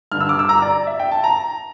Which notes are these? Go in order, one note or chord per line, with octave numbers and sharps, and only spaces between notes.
G2 D3 F6
E6
D6
E6
A#5
D5
E5
G5
A5
A#5